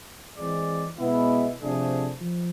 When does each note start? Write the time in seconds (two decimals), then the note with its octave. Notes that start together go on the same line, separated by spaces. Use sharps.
0.36 E3 G#3 C4 G#4 D5
0.98 B2 G#3 B3 E4
1.59 C3 F3 A3 D4 G#4
2.21 F3